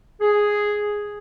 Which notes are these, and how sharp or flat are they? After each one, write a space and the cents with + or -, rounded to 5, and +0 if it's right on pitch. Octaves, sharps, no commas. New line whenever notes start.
G#4 +0